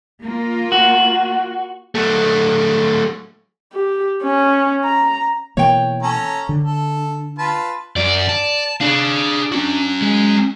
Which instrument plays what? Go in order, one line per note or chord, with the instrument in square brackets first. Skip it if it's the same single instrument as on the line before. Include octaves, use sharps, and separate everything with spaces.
[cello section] A#3 F4
[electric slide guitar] F#4
[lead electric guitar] F#3 A3
[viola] G4
C#4
A#5
[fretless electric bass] B2 E3 A#3 [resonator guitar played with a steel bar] C#5 G5
[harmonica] C#4 A4 A#5
[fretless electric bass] D3
[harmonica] A4
F4 B4 A5
[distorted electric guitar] F#2 [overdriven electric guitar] D5
[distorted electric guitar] A5
[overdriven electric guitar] D4 [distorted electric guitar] G#4 F5
[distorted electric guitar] C#4 F#4
[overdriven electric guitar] G#3